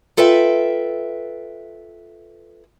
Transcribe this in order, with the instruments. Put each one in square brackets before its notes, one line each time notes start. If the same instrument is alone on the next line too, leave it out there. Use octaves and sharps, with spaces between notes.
[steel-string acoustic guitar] F4 A4 B4 E5 G5